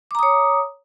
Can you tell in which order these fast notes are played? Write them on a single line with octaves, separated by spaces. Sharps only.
D6 A#5 D#6 C#5